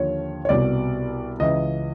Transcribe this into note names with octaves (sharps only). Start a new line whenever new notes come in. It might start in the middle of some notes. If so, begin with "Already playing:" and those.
Already playing: D#2 D3 F3 C#5
C#5
C2 B2 D5
C#2 C#3 E3 D#5